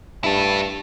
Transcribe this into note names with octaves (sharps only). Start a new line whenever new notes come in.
G2 E4 A4